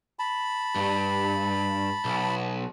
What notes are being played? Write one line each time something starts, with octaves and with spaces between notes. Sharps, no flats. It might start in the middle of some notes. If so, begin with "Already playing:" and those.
A5 B5
G2
B1